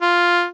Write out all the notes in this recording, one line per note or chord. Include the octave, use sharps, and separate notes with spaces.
F4